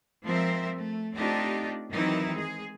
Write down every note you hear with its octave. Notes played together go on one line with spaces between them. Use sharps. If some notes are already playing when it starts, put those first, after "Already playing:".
F3 G#3 C4 A#4 C5 E5
A3
A3 C4 D4 D#4 F4 G4
D#3 E3 F#3 C4 D#4 E4
G#3 G#4